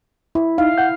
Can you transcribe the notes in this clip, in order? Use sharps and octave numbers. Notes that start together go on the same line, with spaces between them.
E4
D#4 F5
F#5 G6